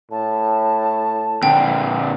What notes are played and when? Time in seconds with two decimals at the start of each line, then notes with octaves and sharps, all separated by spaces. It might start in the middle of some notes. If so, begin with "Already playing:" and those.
0.11 A2 A5
1.43 A#2 D3 G5